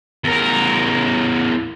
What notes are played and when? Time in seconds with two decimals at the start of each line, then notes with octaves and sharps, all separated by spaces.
0.24 E2 A#4